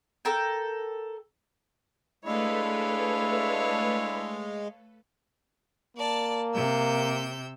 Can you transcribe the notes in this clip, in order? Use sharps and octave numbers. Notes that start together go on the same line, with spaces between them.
A4 A#4 G5
G#3 A3 D4 E4 A4 B4 C#5 F5
A#3 D5 A5
C3 E6 G6